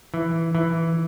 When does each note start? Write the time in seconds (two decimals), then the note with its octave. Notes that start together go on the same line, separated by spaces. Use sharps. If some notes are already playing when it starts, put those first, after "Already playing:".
0.14 E3
0.55 E3